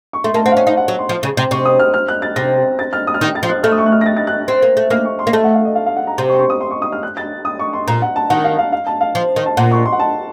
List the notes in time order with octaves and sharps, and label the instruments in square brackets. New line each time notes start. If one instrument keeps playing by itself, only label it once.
[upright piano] C#6
[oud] A3 [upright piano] C6
[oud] A#3 [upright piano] A5
[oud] C4 [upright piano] F#5
[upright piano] F5
[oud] C#4 [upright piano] D#5
[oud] D#4 [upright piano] F5
[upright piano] F#5
[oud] F#3
[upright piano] C6
[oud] F3
C#3
C3
[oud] C3 [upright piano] C#6
[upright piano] D#6
F6
F6
F#6
A6
[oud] C3 [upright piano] A#6
[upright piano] A6
F6
D#6
F6
[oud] D#3 [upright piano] D#6
[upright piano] A6
[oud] F3
[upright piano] F#6
[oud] A3 [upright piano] F6
[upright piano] D#6
C#6
F#6
F6
A#6
A6
A6
F#6
[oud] C4
A#3
A3
[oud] A#3 [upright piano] F6
[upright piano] C#6
C6
[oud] A#3
[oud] A3 [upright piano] A5
[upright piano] F#5
F5
D#5
F5
F5
F#5
A#5
[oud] C3 [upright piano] C6
[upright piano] C#6
C6
C#6
D#6
C6
C#6
D#6
F6
F#6
A6
D#6
C#6
C6
[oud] A#2 [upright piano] A#5
[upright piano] F#5
A5
[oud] D#3 [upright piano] F#5
[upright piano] F5
F5
F5
A5
F5
[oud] F3
D#3
[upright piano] A5
[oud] A#2 [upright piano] F#5
[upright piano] C#6
C6
F#5
A5